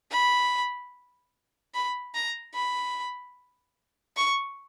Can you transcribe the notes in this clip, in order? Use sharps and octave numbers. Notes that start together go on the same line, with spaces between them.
B5
B5
A#5
B5
C#6